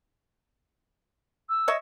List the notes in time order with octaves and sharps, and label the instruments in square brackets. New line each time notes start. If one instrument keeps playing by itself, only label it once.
[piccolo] E6
[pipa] C#5 D#5 E5